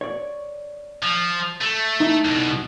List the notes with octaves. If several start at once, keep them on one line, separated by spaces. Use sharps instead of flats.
C#5 D5
F3
A3
D#4 E4
C2 B2